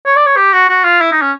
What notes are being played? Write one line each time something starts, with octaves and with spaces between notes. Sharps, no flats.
C#5
D5
C#5
G4
F#4
F#4
F4
E4
D#4
C#4